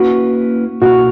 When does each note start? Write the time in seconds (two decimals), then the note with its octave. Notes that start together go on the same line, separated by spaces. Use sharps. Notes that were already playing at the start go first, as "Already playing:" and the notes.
Already playing: A#3 C#4 E4 F#4 B4
0.82 B2 A#3 E4 F#4 A#4